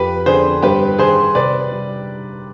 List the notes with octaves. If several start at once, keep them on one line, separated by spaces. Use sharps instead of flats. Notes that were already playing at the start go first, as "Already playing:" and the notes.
Already playing: F2 G4 B4
D3 G#4 C5
G2 G4 B4
D#3 G#4 C5
C3 B4 D5
G3